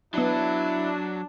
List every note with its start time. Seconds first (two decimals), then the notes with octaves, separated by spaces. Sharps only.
0.14 F#3 B3 D4 E4 B5